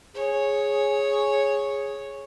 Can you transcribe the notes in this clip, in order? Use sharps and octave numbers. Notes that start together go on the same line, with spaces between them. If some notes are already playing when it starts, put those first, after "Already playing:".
G#4 C#5